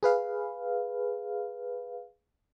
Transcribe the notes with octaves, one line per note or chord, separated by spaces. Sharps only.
G#4 B4 F5